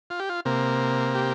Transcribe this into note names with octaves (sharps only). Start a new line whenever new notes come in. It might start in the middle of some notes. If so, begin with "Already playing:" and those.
F4
G4
F4
C3 A#3
G4